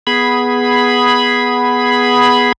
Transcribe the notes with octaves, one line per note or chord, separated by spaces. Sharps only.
B3 G#4 B5